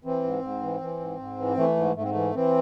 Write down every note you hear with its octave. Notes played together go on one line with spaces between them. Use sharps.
E3 C4
G#2
G#2
E3
E3
G#2
G#2
E3
E3 A3
G#2
G#2 A3
C4
A3
E3
E3 C4